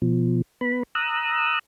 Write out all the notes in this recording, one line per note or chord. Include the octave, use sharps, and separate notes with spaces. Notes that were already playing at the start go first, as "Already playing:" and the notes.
B2 F3
B3 B5
A#5 D#6 E6 F#6